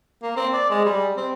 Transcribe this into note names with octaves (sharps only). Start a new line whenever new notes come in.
A#3
C4
D5
G#3
G3
C4